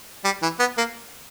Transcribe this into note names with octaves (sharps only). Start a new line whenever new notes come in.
G3
E3
B3
A#3